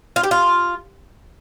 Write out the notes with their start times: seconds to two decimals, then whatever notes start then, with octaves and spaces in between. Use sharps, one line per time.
0.16 F4
0.23 G4
0.31 F4